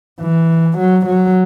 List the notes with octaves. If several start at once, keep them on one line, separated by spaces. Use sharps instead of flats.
E3
F#3
F#3